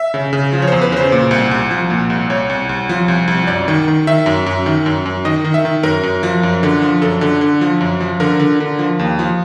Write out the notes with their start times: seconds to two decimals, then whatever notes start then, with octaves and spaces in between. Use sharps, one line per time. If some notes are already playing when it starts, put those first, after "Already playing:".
Already playing: E5
0.14 C#3
0.33 C#3
0.53 F3
0.62 C#5
0.67 E2 C5
0.82 B4
0.92 C#3 C5
1.12 A#2
1.31 C2
1.51 C2
1.71 F3
1.90 A#2
2.10 C2
2.30 C2 C#5
2.50 C2
2.69 C2
2.89 F3
3.08 C2
3.28 C2
3.47 F#2 D5
3.68 D#3
3.88 D#3
4.07 D#3 E5
4.26 F#2
4.46 F#2
4.66 D#3
4.86 F#2
5.06 F#2
5.25 D#3 D#5
5.44 D#3
5.54 E5
5.65 D#3
5.83 F#2 A#4
6.03 F#2
6.23 F3
6.43 F#2
6.63 D3
6.82 F3
7.02 F#2 A4
7.21 D3
7.41 D3
7.61 F3
7.81 F#2
8.01 F3
8.20 D3 A#4
8.40 D3
8.60 D3
8.79 F3
8.99 D#2
9.19 F3